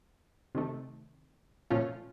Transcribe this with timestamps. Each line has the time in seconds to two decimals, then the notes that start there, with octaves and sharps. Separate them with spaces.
0.55 C3 D#3 A3
1.70 A#2 F3 A3 C#4 F4